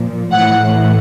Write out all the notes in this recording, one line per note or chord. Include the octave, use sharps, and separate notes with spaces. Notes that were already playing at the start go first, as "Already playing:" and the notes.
Already playing: A#2 F3
A2 E3 F#5